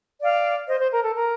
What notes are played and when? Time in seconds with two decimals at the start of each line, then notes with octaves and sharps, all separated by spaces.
0.21 D5 F5
0.67 C5 D#5
0.79 C5
0.92 A#4
1.02 A4
1.15 A#4